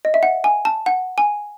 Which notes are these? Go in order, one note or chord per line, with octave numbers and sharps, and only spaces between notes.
D#5
E5
F#5
G#5
A5
F#5
G#5